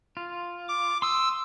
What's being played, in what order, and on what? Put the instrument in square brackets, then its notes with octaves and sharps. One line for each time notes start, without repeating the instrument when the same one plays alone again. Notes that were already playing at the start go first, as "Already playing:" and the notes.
[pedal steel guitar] F4
[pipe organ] D6
[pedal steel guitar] C6 D#6 [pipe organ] E6